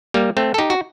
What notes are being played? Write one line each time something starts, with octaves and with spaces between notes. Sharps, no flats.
G3 A#3
A3 C4
A4
D#4 G4
F#4